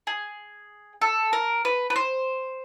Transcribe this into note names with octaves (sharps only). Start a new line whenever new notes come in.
G#4
A4
A#4
B4
B4
C5